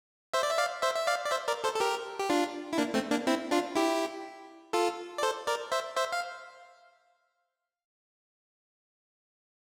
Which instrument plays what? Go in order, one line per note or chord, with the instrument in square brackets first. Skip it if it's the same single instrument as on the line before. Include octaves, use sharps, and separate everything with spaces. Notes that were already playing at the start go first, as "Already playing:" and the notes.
[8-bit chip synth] C5 E5
D5
E5
D5 F5
C5 E5
E5
D5 F5
D5
C5 E5
A#4 D5
A4 C5
A4
G4 A#4
G4
D4 F4
E4
A#3 D4
A3 C4
A#3 D4
C4 E4
D4 F4
E4 G4
F4 A4
D5
A4 C5
A#4 D5
C5 E5
C5 E5
F5